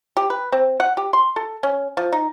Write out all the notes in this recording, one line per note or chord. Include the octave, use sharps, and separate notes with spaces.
G4
B4
C4
F#5
G4
C6
A4
C#4
F3
D#4